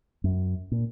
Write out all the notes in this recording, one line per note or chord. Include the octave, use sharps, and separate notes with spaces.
F#2
A#2